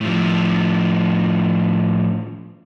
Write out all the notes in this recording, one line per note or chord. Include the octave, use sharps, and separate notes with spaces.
A2 F3